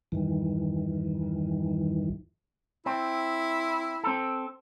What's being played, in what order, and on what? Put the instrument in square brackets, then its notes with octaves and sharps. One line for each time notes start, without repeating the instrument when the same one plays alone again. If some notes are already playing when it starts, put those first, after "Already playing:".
[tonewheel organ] E2 G2 D#3 E3
[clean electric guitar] C4 [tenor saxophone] E4
[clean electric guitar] C4 A4